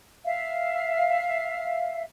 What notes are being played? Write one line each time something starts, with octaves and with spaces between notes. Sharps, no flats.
E5 F5